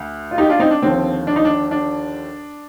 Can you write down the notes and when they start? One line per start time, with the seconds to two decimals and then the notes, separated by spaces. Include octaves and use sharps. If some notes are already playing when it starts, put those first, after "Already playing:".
Already playing: D2
0.31 F4
0.38 D#4 G4
0.49 D4 F4
0.59 C4 D#4
0.71 D4
0.82 D#2 D3 F3 C4
1.27 D4
1.36 D#4
1.45 D4
1.71 D4